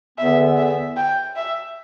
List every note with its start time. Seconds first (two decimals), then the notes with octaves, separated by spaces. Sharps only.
0.17 E2 D3 B3 E5
0.57 E5
0.96 G5
1.36 E5